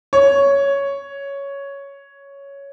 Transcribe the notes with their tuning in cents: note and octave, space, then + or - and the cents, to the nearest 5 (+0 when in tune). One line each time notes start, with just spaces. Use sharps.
C#5 +5